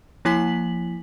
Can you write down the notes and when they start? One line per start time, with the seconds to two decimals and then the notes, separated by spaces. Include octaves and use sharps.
0.25 F3 A#3 E4 G#5 B6 F#7